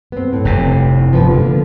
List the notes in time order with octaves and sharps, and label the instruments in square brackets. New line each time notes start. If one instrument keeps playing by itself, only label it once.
[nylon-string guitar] B3 C4
A2
[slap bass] F1 C3
[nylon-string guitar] F3 B3 B4
D3 A#3